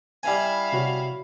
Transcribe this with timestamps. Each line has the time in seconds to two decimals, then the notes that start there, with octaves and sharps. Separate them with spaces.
0.23 G3 E4 F5 G#5
0.72 C3 F#4 C#5